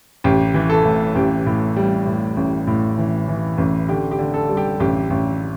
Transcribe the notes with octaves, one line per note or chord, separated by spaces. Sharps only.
A1 G4
E3
A4
A2
A1 G4
A2
G3
A2
A1
A2
E3
E3
A1
D3 G4
G4
D3
A4
G3
G4
A1 G4
A1